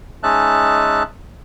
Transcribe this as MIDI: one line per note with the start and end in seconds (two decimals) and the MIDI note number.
0.23 1.03 56
0.23 1.03 61
0.23 1.03 63
0.23 1.03 76
0.23 1.03 81
0.23 1.03 90